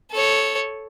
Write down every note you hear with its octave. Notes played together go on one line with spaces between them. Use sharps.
A4 C#5